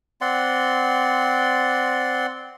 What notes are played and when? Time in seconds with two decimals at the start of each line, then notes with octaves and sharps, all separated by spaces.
0.21 C4 D5 F#5 C6